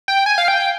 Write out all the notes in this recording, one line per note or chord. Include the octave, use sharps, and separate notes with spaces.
G5
G#5
F5
G5